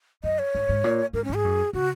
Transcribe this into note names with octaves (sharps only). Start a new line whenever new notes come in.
F#2 D#5
C#5
G#2
G#2
A#2
G#2 A#4
C#4
G#2 G#4
F#2
C#3 F#4